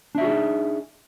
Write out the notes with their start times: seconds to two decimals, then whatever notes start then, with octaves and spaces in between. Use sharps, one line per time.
0.15 D4
0.18 E5
0.21 F#4
0.24 G#4
0.28 D#4